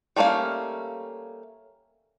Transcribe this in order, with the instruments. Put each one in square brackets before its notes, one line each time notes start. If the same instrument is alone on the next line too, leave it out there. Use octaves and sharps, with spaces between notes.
[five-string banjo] G3 A3 A#3 C#4 F5